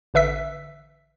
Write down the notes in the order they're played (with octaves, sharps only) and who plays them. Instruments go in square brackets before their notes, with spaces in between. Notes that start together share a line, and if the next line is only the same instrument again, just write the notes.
[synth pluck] A1 D3 B4 E5 E6 B6